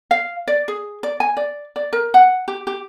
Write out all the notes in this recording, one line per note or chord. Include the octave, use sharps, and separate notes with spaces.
F5
D5
G#4
D5
G#5
D5
D5
A#4
F#5
G4
G4